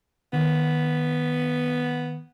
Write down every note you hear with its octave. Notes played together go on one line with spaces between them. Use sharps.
D#3 B3